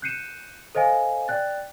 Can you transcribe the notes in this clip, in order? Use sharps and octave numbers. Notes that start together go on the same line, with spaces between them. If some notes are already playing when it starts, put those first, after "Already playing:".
F#6 G6 C7 C#7 D#7 E7
A4 C5 D#5 F5 G#5
D5 G5 F#6 A6